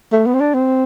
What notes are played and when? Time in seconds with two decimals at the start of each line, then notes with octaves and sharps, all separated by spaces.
0.12 A3
0.26 B3
0.34 C4
0.40 D4
0.54 C4